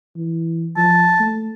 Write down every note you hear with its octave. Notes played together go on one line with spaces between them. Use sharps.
E3
F3 A5
A3